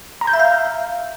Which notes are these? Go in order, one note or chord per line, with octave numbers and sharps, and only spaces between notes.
A#5
G6
E5
F5